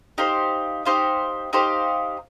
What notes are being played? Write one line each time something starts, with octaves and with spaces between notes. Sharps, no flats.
D#4 G4 C5 F5
D#4 G4 C5 F5
D#4 G4 C5 F5